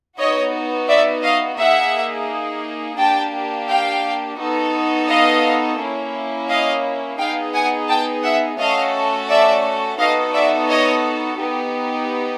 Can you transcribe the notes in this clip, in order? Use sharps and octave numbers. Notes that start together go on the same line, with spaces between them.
B3 D#4 F#4 C#5 D#5
D5 E5
D#5 F5
A#3 D#4 G#4 E5 F#5
A#3 D4 G4 G5 A5
F5 G5
B3 D#4 F#4 A4
D#5 F5
A#3 C#4 E4
D#5 F5
B3 D#4 G#4 F5 G5
F#5 G#5
G5 A5
E5 F#5
A3 C#4 F#4 A4 D#5 F5
D5 E5
B3 D#4 F#4 A4 D#5 F5
D5 E5
C#5 D#5
B3 D#4 G4